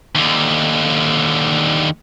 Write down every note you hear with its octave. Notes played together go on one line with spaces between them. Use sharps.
D#2 D3